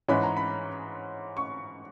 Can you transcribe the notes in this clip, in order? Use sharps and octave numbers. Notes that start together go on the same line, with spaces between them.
G#2 E3 G#3 C#4 B5
A#5
B5
C#6